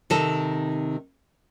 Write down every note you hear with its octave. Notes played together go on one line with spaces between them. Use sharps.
C3 D#3 D#4 A4